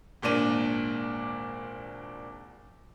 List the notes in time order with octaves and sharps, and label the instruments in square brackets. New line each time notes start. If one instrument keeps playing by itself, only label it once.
[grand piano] G#1 A#2 A#3 D4 D#7